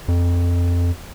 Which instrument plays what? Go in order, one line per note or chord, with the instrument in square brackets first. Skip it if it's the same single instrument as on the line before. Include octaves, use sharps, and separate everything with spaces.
[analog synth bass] F2